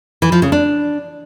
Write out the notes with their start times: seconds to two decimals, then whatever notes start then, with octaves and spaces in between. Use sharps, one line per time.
0.22 E3
0.32 F3
0.42 C#3
0.52 D4